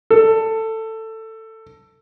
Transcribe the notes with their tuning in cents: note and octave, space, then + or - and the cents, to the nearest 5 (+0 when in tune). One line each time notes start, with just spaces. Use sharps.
A4 +15